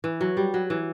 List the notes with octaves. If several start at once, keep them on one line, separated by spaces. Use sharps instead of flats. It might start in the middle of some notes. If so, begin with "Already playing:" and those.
E3
F#3
G3
F#3
E3